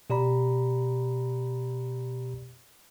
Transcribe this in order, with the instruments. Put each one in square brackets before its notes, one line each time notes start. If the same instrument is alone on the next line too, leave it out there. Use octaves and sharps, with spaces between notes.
[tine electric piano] B2 G4 D5 A#5 B5